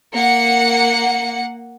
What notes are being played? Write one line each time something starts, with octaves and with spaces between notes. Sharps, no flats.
A#3 F#5 C#7